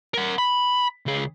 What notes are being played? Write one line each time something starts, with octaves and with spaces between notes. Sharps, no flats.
A#4 F#5
B5
C#2 G#4